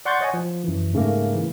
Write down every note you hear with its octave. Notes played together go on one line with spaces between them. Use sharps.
D5 F#5 C6 C#6 G6 A6
C#5 D#5 F#5 G#5
F3
F#2 E3
G#2 C#3 A3 A#3
E3